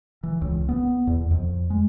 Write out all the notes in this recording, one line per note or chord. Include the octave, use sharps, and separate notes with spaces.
E3
C#2
B3
E2
F2
G#3